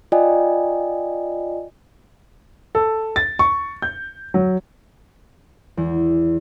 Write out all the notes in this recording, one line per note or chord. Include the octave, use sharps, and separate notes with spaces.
F4 D5 D#5 G5 G#5
A4
A6
C#6
G6
F#3
E2